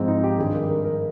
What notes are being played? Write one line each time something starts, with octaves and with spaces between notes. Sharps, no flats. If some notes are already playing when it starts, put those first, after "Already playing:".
Already playing: G#2 F3 G#3 C4
D#4
G4
G2 D#3 G#4
A#4
A#4
A#4